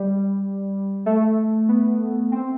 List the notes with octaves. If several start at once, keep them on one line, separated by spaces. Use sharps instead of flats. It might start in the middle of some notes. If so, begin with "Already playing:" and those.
Already playing: G3
A3
B3
C4